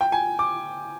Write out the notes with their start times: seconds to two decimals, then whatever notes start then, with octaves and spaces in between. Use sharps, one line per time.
0.01 G5
0.12 G#5
0.39 D6